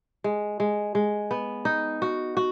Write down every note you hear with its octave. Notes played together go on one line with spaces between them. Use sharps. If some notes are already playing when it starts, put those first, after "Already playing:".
G#3
G#3
G#3
B3
D#4
F#4
F#4